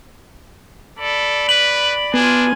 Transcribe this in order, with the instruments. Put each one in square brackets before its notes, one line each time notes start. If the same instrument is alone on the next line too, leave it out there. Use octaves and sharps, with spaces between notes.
[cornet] A4 [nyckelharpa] D5 B5
[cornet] B4 [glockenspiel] F#7
[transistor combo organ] B3 [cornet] D4 [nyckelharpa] F4 G#5